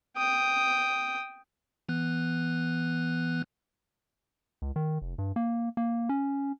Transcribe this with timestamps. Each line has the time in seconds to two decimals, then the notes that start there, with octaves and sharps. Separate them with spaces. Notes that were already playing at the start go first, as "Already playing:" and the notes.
0.17 G5 D#6
1.89 E3 B3 F#6
4.62 C#2
4.76 D#3
5.02 F1
5.18 G2
5.36 A#3
5.77 A#3
6.09 C#4